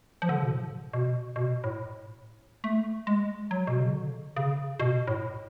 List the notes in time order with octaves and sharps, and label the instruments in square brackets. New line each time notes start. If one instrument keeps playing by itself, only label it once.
[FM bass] F3
D3
C#3
B2
A2
B2
B2
A2
A3
G#3
F#3
B2
C#3
D3
C#3
B2
A2